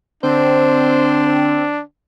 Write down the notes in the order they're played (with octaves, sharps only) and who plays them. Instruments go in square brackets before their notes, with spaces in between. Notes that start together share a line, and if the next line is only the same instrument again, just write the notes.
[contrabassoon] D3 [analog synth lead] C4 [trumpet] D4 [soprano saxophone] C5